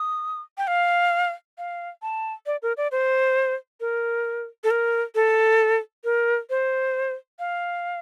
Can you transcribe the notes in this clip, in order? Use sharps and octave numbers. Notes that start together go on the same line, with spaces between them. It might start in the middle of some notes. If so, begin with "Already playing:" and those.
Already playing: D#6
G5
F5
F5
A5
D5
A#4
D5
C5
A#4
A4
A#4
A4
A#4
C5
F5